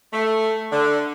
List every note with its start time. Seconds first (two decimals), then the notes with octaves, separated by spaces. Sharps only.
0.13 A3
0.72 D3